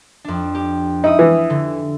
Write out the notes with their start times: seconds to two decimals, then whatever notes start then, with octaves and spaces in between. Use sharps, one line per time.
0.24 F2 D4
0.55 G4
1.04 D#4 E4 D#6
1.19 E3
1.50 D3